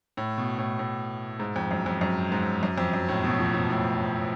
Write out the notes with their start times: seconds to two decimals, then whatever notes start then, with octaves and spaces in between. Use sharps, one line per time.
0.17 A2
0.38 B2
0.58 A2
0.79 A2
1.40 G#2
1.56 F2
1.71 F#2
1.86 F2
2.01 F#2
2.32 G#2
2.63 F#2
2.78 F2
2.93 F#2
3.08 A2
3.24 B2
3.39 F3
3.54 B2
3.70 A2